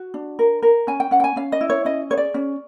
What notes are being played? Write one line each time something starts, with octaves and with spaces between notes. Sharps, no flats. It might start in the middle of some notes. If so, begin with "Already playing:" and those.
Already playing: F#4
D4
A#4
A#4
C#4 G#5
G5
C#4 F#5
G5
G#5
C#4 F5
D#5
E4
C#5
C#4 D#5
G#4 C#5
D5
C#4